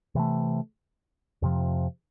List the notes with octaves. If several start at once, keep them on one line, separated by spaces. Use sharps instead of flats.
C3 E3 A3
F2 C3 F3